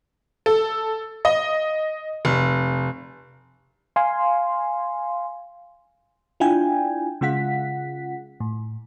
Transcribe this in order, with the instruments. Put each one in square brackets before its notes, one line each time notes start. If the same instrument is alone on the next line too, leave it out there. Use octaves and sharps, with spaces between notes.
[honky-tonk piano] A4
D#5
F1
[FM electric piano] F5 G#5 C6
D4 E4 F4 G5 G#5
C#3 G#3 F4 F#5 B6
A2